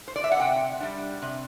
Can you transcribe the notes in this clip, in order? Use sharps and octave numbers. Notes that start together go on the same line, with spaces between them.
C5
D5
E5
F#5
C3 G5
G3 D4
C3